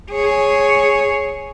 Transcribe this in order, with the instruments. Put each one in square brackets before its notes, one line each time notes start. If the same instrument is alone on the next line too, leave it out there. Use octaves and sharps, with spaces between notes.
[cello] G#4 C#5